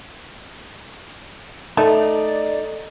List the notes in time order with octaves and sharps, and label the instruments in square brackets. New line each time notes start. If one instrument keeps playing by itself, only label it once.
[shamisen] A3 [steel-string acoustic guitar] D#4 [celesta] A4 [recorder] D5